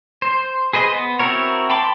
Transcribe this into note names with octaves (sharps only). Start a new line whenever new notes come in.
C5
G#4 B4 C5 D#5
B3
C4 E4 F#4 A#4 C#5
G5 A5 B5 C6 D6